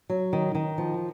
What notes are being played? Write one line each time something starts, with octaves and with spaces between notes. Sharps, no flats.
F#3
D#3
D#3
F3